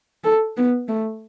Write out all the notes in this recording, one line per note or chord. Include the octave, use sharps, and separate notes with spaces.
A4
B3
A3